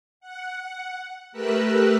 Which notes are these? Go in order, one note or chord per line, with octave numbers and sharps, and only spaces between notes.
F#5
A3 G4 A#4 B4 E6 F#6